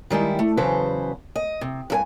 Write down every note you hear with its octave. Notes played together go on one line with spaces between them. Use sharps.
D#3 G3 G#3 E4
A3
E2 C#3 F#3 B4 C5 A5
D#5
C3
G2 A4 G#5